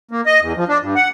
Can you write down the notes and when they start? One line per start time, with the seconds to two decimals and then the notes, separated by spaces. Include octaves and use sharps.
0.11 A#3
0.26 D#5
0.40 E2
0.57 F3
0.68 D4
0.82 G2
0.95 F#5